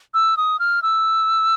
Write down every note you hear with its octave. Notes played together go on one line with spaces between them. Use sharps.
E6
D#6
F6
E6